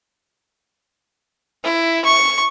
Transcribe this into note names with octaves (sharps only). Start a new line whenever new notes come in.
E4
C#6